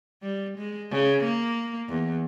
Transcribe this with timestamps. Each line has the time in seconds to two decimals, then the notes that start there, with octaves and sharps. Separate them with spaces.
0.22 G3
0.58 G#3
0.91 C#3
1.25 A#3
1.89 E2